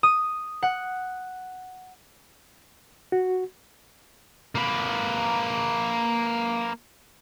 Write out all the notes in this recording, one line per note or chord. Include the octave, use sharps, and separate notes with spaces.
D#6
F#5
F#4
A#3 B4